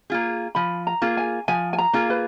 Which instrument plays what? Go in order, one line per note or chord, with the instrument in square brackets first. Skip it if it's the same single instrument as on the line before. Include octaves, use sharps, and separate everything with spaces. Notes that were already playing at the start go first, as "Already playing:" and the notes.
[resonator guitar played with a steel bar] A#3 F4 G#4
[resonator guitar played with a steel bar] F3 [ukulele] B5
[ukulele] A#5
[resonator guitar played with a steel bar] A#3 F4 G#4
[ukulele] G#5
[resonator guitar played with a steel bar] F3 [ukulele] G#5
[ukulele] G#5
A#5
[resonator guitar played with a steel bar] A#3 F4 G#4
[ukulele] B4